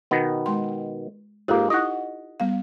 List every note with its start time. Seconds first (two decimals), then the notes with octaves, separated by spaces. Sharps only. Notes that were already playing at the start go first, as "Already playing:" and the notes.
0.11 B2 D#3 B3
0.46 G#3 C6
1.48 G#2 A#3 F4 G4 A4
1.70 D#4 E4 D#5 F#5 C#6
2.40 G3 B3 F5